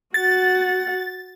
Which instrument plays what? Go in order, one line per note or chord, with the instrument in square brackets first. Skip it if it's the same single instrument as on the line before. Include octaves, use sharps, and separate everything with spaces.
[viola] F#4 F#5 [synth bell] A6